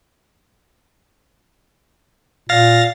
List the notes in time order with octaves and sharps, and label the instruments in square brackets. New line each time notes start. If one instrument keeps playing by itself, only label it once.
[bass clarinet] A#2 [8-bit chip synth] F5 A6 A#6